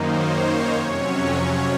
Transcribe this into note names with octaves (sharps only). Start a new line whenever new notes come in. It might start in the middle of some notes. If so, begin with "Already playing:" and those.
Already playing: F#2 D#3 A#3 D#4 C5
C#5
C#5
F2 C3 F#3 C#4 C#5